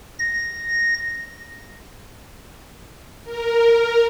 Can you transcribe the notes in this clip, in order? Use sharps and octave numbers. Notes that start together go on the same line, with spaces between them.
A#6
A#4